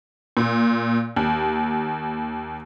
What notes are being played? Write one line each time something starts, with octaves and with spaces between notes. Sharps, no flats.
A#2
D#2